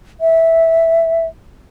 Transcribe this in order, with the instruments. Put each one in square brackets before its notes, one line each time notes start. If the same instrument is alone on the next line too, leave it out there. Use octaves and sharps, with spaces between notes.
[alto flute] E5